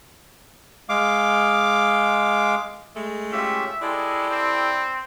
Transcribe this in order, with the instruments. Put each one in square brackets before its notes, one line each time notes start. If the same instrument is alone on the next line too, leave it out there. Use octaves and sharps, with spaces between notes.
[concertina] G#3 F5 D6
[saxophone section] G#3 A3
[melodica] C#4 F4 G4 [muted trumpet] E5
[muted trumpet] G#3 [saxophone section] E4 G4 D5 [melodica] A4
[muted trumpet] C4